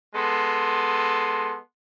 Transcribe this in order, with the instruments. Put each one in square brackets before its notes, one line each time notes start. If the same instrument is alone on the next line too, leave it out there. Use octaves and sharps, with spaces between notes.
[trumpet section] G#3 B3 A4 C6